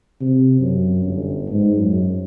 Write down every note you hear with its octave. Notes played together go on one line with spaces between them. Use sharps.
C3
F#2
G1
G#2
F#2